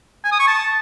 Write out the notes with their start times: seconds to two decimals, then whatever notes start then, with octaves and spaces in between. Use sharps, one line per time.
0.24 G#5
0.32 D#6
0.39 C#6
0.47 A5